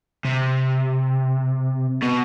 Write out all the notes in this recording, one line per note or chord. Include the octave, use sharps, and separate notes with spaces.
C3
B2